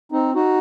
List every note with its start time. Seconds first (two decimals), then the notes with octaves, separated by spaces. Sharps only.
0.12 C4 D#4
0.35 D#4 F#4